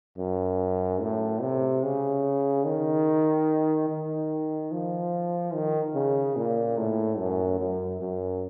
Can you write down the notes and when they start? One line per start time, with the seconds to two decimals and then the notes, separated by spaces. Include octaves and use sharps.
0.18 F#2
1.01 A2
1.42 C3
1.83 C#3
2.65 D#3
3.89 D#3
4.72 F3
5.54 D#3
5.95 C#3
6.36 A#2
6.78 A2
7.19 F#2
7.60 F#2
8.01 F#2